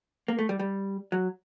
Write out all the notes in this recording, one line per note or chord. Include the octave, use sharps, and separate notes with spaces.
A#3
A3
G3
G3
F#3